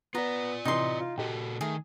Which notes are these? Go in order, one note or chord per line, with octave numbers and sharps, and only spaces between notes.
B3 F4 D5 A#5
C3 E3 D#4 D#5 C6
F4
A#2 F#4 G4 A4 D#5
D#3 A3 G#4